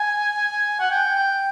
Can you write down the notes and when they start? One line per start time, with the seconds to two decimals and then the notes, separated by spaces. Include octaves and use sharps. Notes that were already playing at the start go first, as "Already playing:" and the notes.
Already playing: G#5
0.80 F#5
0.91 G5
1.16 G5